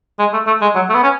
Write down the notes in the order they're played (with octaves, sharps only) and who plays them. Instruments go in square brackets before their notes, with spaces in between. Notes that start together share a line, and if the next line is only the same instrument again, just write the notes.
[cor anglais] G#3
A3
A3
G#3
F#3
A3
B3
C#4